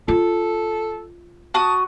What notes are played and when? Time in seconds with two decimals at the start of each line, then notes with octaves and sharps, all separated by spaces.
0.08 F4 A4
1.54 F#4 A5 D#6